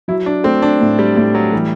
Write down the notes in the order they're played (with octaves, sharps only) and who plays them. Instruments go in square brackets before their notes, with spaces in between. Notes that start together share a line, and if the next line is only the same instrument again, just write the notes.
[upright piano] F#3 [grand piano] E4
[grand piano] D4
[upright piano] A3 [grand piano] C4
[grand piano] D4
[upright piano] A2
[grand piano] G3
[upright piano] A2 [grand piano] G3
[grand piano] F#3
[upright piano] E3 [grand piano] G3